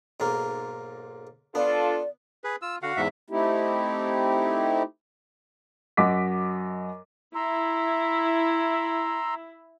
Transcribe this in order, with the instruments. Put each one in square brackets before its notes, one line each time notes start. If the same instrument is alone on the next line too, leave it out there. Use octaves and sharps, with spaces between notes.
[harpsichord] B1 G#2 A#3
[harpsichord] B3 [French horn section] D4 F4 A4 [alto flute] D5
[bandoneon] G#4 B4
[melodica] F4 [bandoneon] E6
[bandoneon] D3 [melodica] F#4 F5 F#5
[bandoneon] E2 G#2 E5
[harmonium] A3 C4 D#4 E4 G4
[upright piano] F#2 F#4 D#5 D6 B6
[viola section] E4 [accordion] A#5 C6 E6